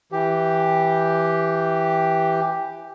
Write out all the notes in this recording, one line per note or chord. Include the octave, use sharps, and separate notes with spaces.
E3 G4